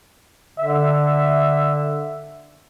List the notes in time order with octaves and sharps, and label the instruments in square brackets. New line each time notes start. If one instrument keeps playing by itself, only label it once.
[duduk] D3 [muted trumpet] E5